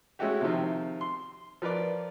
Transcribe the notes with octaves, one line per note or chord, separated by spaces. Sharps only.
G#3 A3 C#4 E4 F#4 G4
C3 D#3 F3
C6
F3 A#4 B4 D5